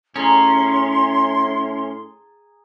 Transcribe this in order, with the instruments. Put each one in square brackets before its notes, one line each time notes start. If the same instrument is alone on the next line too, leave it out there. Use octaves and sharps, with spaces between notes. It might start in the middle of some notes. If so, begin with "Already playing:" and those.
[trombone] A2 [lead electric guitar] C#4 [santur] G#4 A5 A#5 [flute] C6